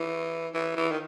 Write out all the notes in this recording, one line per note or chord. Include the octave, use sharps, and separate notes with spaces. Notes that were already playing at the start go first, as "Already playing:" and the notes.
Already playing: E3
E3
E3
D#3